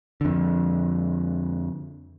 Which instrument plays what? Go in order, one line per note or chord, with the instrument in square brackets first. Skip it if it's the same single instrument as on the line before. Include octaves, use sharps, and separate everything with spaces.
[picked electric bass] F2 D3